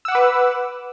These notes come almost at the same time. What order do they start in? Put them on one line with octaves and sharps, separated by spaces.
E6 F#5 D6 B4